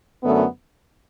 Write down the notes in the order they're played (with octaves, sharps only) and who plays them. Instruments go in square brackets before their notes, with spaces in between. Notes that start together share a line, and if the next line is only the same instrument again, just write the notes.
[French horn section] F#2 D3 A3 B3